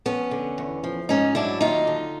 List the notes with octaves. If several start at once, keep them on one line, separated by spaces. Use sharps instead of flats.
F2 B3 C#4
D3
E2
F3
G#2 C#4 D#4
F#3 D4 E4
D#2 D#4 F4
D3